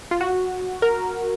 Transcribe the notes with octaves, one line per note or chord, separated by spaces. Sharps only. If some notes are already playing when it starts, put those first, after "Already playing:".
F4
F#4
A#4